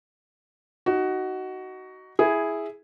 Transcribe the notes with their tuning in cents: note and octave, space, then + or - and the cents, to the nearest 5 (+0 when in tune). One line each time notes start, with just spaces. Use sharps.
D#4 +0 F#4 +15
E4 +0 G#4 +0